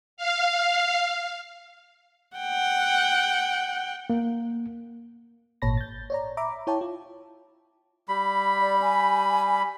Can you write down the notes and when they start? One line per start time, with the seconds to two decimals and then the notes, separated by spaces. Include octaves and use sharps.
0.17 F5
2.37 F#5 G5
4.10 A#3
5.62 G#1 A#2 C#5 A5 B5 A#6
5.77 G6 A6
6.10 C#5 D5 A#5
6.37 E5 A#5 B5 D6
6.67 E4 C#5 G5 A5
6.81 F4
8.08 G3 B5
8.60 D5
8.81 G#5